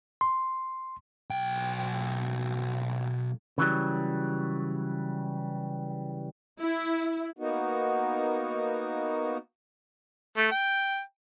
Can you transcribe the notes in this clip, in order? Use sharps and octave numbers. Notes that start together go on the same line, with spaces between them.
C6
B1 G5
C#3 E3 F#3 G3
E4
A#3 B3 D#4 F#4
A3
G5